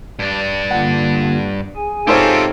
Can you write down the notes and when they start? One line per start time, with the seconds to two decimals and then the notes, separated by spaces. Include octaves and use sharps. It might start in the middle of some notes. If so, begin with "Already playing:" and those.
0.19 G2 D4
0.71 D3 A#3 F4 F#5
1.76 G#4 G#5
2.07 G#2 C4 F4 G4 A4 C5 C#5 E5